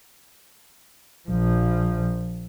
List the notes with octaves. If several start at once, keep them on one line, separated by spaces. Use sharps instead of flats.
A#1 F3